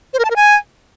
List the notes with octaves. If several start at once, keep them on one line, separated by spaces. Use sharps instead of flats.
C5
A#4
A5
A#4
G#5